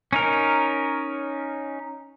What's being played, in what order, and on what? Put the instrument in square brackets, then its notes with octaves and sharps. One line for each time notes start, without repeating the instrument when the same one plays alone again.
[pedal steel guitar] C#4 D#4 A#4